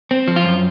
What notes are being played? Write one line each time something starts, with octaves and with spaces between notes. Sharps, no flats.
C4
F3
F4
F#2